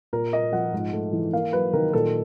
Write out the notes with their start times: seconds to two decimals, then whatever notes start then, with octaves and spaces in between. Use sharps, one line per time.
0.13 A#2 A#4
0.33 A#3 D#5
0.52 F3 F#5
0.73 G#2
0.93 A3
1.13 E3
1.33 A#3 F5
1.53 F#3 B4
1.73 D#3 A#4
1.93 A#2 A4